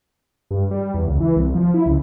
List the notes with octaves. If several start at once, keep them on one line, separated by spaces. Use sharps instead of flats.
G2
G3
E2
C#2
E3
C2
F3
E4
C#2